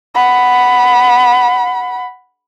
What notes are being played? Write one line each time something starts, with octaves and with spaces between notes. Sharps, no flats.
F#5 B5